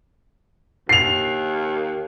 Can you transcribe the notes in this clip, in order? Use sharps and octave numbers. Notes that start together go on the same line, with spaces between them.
D#2 C7 F7